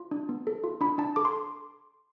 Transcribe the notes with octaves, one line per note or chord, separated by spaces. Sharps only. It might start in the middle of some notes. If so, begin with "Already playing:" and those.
Already playing: F4
D4
B3
A4
F4
D4 B5
D4 A5
A4 D6
C6